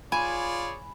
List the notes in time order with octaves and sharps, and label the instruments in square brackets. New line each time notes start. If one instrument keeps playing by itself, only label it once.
[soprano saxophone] F4 [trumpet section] G#4 C#5 D5 [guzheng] G#5 [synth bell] B5